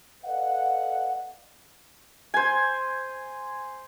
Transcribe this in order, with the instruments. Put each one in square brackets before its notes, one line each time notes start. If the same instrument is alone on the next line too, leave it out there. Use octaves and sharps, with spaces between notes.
[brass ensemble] A4 B4 D5 D#5 F5 F#5
[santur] C5 G#5